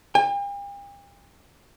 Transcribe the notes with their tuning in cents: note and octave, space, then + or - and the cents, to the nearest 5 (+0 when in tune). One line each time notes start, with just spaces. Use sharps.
G5 +45